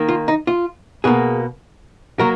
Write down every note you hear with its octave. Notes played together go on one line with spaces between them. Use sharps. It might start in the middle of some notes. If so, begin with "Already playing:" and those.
Already playing: D#3 A#3
F4
D#4
F4
B2 A#3 G#4
F#3 A#3 A#4